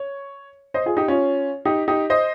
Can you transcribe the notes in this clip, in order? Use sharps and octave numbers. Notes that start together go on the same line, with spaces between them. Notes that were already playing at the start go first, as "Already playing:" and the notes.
Already playing: C#5
C5 D#5
F4 G#4
D#4 G4
C#4 F4
D#4 G4
D#4 G4
C5 D#5